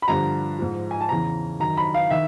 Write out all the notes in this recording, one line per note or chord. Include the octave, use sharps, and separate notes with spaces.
B5
G2 D3 F3 A#5
G#2 F3
G#5
A5
E2 C#3 E3 A#5
F#2 D#3 A#5
B5
F5
D#3 E5